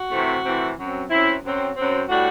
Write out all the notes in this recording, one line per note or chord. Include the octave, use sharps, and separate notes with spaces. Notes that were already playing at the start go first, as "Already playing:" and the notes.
Already playing: F#4
C3 E3 A3 C4
C3 E3 A3 C4
F#2 F#3 C4
F#2 F#3 C4 E4
F#2 F#3 C4
F#2 F#3 C4
A2 G3 D4 F#4